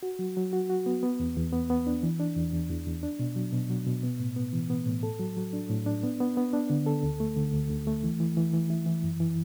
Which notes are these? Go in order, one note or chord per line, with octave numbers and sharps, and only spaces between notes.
F#4
F#3
F#3
F#4
F#4
B3
B3
E2
E2
B3
B3
D4
E3
D4
E2
E2
E2
E2
D4
B2
F#3
B2
F#3
B2
B3
A2
B3
E3
B3
A2
A4
F#3
F#3
D4
A2
D4
B3
B3
B3
D4
D3
A4
D2
A3
D3
D2
D2
A3
E3
E3
E3
E3
E4
E3
F#2
E3